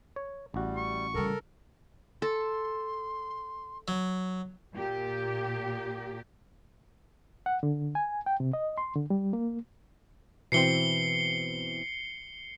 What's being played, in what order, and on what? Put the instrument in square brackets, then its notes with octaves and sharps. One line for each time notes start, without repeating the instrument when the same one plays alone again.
[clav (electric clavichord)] C#5
[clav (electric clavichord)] A1 F#4 [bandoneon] G3
[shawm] C#6
[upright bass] C#3 G3 [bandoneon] A4 A#4
[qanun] A4 [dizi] C6
[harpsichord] F#3
[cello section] A#2 G4
[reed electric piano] F#5
D3
G#5
G5
C3
D#5
C6
D3
G3
A#3
[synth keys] B2 E3 C4 [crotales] C7 C#7 G7